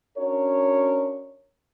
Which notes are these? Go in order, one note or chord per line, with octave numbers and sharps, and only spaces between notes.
C#4 D4 F#4 A#4 C#5